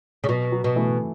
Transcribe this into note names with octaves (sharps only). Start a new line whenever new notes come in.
C#3
B2 F#3
F#3
B2
E3 A3